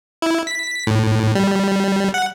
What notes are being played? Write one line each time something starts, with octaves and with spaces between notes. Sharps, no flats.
E4
B6
A2
G3
F#5